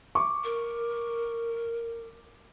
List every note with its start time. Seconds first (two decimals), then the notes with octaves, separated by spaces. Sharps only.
0.15 C#6 D6
0.44 A#4